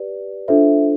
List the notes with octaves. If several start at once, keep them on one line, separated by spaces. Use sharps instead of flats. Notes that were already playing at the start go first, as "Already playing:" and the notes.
Already playing: G4 B4 D5
D4 F4 A4 C5 E5